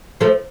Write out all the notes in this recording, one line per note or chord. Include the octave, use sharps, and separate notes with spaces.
F3 A3